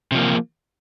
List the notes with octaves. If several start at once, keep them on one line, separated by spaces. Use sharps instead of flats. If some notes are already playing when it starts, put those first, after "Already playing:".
C3 F3 A#3